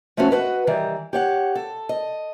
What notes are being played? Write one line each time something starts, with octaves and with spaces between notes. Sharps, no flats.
F3 A3 B3 C#4 F#4
F#4 G4 B4 D#5
D#3 E3 G3
G4 C#5 F#5
A4
D#5